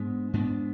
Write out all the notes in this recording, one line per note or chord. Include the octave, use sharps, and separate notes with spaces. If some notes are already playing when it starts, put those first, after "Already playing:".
Already playing: G#2 G#3 B3 D4
G#2 G#3 B3 D4